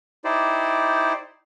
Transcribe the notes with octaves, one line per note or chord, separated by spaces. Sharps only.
D#4 E4 G4 C5 D5